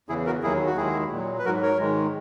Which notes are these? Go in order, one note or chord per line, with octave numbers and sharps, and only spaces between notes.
E2 C#3 E3 E4 G#4
F#4 A#4
D#2 D#3 F#3 E4 G#4
F#4
D#2 D#3 G#3 E4 G#4
A#2 F#3
B4
G#2 F#3 F#4 A#4
A#4 C#5
G#2 D#3 G#3